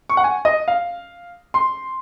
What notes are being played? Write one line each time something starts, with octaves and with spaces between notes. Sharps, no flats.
C#6
F#5
G#5
D#5
F5
C6